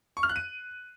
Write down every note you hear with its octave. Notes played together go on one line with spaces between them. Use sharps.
C#6
F6
F#6
D#7